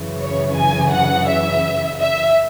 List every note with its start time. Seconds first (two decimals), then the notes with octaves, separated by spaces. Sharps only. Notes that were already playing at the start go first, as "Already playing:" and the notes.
Already playing: F#2 C#3 E3
0.21 C#5
0.57 G#5
0.93 F#5
1.28 E5
1.99 E5